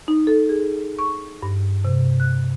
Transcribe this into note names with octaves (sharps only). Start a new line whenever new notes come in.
D#4
A4
G#4
C#6
G2
C3
F#6